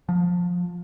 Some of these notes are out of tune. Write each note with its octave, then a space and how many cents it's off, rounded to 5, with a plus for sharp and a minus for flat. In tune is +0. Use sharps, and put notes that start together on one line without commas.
F3 +20